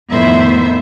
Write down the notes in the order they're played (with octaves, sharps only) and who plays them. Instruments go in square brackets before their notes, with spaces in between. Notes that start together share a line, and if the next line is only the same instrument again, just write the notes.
[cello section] F2 A2 D#3 B3 C5 E5